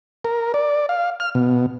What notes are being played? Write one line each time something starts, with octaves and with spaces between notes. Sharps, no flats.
A#4
D5
F5
F6
B2